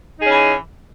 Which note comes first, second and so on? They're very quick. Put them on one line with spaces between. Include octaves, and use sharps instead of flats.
D#4 G#4 C#4 E3